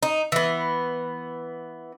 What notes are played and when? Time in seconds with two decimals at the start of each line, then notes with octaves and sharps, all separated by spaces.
0.03 D#4
0.32 E3 B3